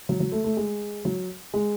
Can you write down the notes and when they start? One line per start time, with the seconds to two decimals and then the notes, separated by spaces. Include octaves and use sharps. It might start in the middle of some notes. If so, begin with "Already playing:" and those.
0.09 F#3
0.20 F#3
0.32 A3
0.44 A3
0.57 G#3
1.05 F#3
1.54 G#3